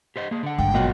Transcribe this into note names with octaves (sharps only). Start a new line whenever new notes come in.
G4 C5 D#5
A#3 G#4
D3 F#5
G#1 G2 G5
B2 F#3 F4 A#4 F#5